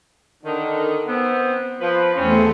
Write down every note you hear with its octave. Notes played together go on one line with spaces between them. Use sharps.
D3 D#3
B3 C4
F3 B4
E2 A3 C4 C#4